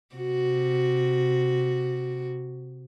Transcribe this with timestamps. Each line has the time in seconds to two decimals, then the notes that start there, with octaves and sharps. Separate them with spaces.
0.15 C3 F#4